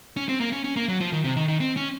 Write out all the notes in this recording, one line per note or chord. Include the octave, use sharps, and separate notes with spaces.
C#4
C4
A#3
C#4
C#4
A#3
F#3
F3
D#3
C3
D#3
D#3
C4
C#4